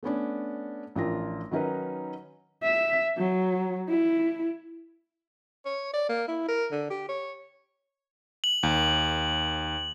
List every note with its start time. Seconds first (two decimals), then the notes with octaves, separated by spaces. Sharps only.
0.03 A3 B3 C#4 D4
0.95 A1 F3 D4 F4 A#4 A#6
1.51 D#3 F#3 C#4 D#4 A#4 B4
2.64 E5
3.17 F#3
3.88 E4
5.65 C#5
5.94 D5
6.09 A#3
6.28 E4
6.48 A#4
6.71 D3
6.90 G4
7.09 C#5
8.44 F#7
8.63 D#2